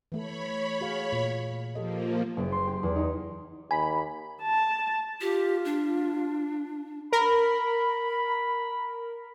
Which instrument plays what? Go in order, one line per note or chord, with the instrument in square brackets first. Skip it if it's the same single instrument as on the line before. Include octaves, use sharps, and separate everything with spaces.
[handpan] E3 A3 A4 [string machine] C#5 B5
[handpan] F#4 G#4 F5
A#2
[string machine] F3 A#3 [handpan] G4 A4 D#5
[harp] F#1
C6
G4
E2
D#4
[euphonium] D#2 [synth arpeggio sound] G#5 [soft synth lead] B5
[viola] A5
[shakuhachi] F4 [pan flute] G4
[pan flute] D4
[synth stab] A#4 [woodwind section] B5